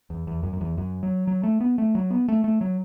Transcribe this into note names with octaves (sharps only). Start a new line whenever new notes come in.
E2
E2
F#2
F#2
E2
F#2
F#3
F#3
A3
B3
A3
F#3
B3
A3
A3
F#3